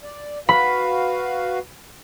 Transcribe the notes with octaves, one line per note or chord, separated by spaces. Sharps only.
D5
F#4 B4 F5 B5